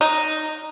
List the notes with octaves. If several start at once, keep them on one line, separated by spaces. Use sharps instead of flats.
D#4